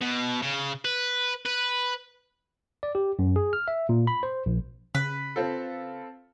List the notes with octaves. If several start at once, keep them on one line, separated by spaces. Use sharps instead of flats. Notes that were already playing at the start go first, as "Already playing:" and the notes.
B2
C#3
B4
B4
D5
G4
F#2
G#4
F6
E5
A#2
B5
C5
A#1
C#3 B4
C4 F4 A4